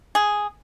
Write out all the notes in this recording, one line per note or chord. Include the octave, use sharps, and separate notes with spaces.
G#4